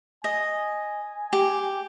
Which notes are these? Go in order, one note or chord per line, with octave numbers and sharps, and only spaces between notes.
D#5 G#5
G4